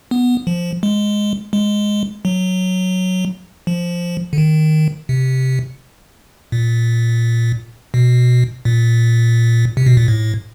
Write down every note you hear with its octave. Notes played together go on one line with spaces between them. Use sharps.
B3
F3
G#3
G#3
F#3
F3
D3
D#3
C3
A#2
B2
A#2
C3
B2
A#2
A2